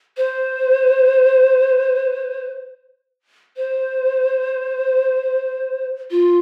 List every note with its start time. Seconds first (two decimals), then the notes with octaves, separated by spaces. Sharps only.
0.17 C5
3.57 C5
6.11 F4